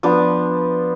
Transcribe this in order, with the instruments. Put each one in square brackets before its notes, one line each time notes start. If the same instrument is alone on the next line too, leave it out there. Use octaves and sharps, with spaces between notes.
[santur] F3 B3 D4